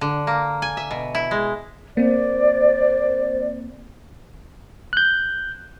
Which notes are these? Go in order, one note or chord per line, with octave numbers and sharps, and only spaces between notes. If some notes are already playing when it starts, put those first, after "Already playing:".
D3
A#3
G#5
E5
B2
E4
G#3
A#3 C4 C5 D5
F#6 G6